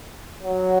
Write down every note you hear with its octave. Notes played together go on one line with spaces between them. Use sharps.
F#3